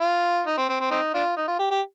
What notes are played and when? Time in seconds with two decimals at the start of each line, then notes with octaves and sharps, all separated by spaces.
0.01 F4
0.47 D#4
0.58 C4
0.69 C4
0.80 C4
0.91 C4 D#4
1.14 D4 F4
1.37 D#4
1.48 F4
1.59 G4
1.71 G4